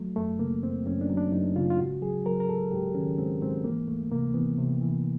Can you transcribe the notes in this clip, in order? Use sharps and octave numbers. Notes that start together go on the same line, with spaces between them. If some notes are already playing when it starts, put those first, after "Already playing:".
Already playing: F#3 A3
F#2 A3
C#3 A#3
F#2 C4
F#2 C#4
D4
F#3
D4
F#2 D#4
C#3 F4
F4
G#2 F#4
F#3 G#4
F#3 A#4
A#4
G#2 A4
G#2 G4
D#3 C#4
G#2 C4
G#2 C4
E3 A#3
D2 A3
C3 A#3
E3 B3
C3
E3